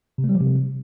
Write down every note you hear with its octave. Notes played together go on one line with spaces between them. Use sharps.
C3
A3
G3
F3
C3